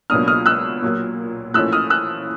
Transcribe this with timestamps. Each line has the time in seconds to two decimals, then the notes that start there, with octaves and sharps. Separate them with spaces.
0.10 C#2 B2 F#3 A#3 D4 D#6 F6
0.28 D#6 F6
0.46 E6 F#6
0.82 A#2 F#3 A#3
1.54 A1 A2 F3 A#3 C#4 E6 F#6
1.72 D#6 F6
1.90 E6 F#6